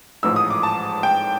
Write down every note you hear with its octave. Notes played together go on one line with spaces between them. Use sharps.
A1 G#2 F3 E6
D#6
D6
A5
G5